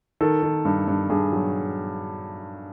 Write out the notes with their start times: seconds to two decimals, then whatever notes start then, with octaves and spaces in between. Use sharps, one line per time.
0.21 D#3 A4
0.42 D#3
0.65 G2
0.88 G2
1.10 G2 G#4
1.32 F#3